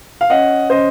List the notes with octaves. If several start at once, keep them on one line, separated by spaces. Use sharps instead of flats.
F5
C#4 D#5 F#5
C#3 C5 D#5